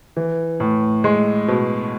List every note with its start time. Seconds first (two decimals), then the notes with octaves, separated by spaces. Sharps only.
0.17 E3
0.60 A2
1.04 G#3
1.48 B2